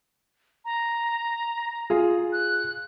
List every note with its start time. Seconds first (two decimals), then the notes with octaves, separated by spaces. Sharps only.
0.65 A#5
1.90 F4 G#4
2.33 F#6